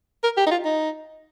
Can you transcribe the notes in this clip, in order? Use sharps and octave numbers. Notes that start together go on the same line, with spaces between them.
A#4
G4
D#4
F4
D#4